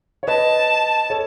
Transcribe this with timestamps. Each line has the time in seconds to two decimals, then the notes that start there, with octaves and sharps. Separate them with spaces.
0.23 C#5
0.28 B4 D#5 A5
1.10 A4 C#5